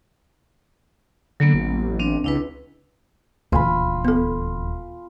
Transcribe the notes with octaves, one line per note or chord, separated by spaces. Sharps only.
D3 F#3 A#3 B3
A1
C4 D4
C#2 D4 E4 B4
D#1 D2 E3 F4 G#5 B5
B3 A4